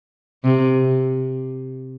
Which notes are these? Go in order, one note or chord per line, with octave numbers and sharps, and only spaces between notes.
C3